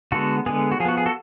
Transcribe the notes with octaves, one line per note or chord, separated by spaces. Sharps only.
D3 G#3 B3 F#4 A4
D3 G#3 B3 G#4
F#4
F3 G#4
B3 F#4
G#4
F#4 A4